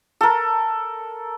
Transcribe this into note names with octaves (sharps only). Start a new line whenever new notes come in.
A4 A#4